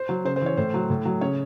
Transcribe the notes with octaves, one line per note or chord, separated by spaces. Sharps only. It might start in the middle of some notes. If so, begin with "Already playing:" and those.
Already playing: C5
F#3
C#3 C5
C5
E3 C#5
A2 C5
F#3
A2
F#3
C#3 C#5